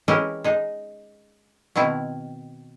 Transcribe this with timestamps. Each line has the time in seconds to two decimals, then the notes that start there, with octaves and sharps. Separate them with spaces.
0.08 E3 G#3 C#4 E4 G4 A#4
0.44 G#3 D#4
1.76 B2 D#3 C4 E4